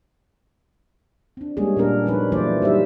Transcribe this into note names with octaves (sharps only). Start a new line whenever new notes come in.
C4 D4
G3 G#3 A#3 C#4 G#4
A#2 G#3 B3 D4 A#4
F3 C#4 D#4 B4
E3 F#3 A3 A#3 C5 D5
G3 D#4 C5 E5